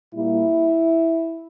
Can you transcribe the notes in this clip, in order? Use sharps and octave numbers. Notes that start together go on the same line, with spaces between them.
A#2 G3 A#3 E4